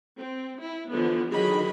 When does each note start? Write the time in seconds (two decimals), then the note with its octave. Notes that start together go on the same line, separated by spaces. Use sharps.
0.19 C4
0.61 E4
0.91 D3 E3 F3 B3
1.30 D3 D#3 F#3 G#4 D#5 B5